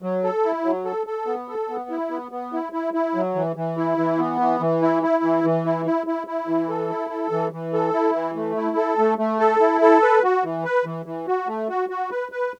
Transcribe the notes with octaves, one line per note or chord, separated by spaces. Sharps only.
F#3
A4
E4
F#3
A4
A4
B3
A4
B3
E4
B3
B3
E4
E4
E4
F#3
E3
E3
E4
E3
B3
E3
E3
E4
E4
E3
E3
E4
E4
E4
E4
E3
A4
E4
A4
E3
E3
A4
E4
E3
A3
E4
A4
A3
A3
A4
E4
A4
B4
F#4
E3
B4
E3
E3
F#4
A3
F#4
F#4
B4
B4